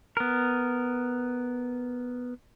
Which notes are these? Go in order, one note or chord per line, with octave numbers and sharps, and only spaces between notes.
B3 A#4